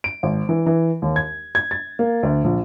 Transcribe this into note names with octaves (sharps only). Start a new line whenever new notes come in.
D7
G#1
E3
E3
D#2
G#6
G#6
A6
A#3
D2
A#1